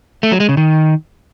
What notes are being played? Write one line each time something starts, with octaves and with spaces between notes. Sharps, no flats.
A3
F#3
G#3
C#3
D#3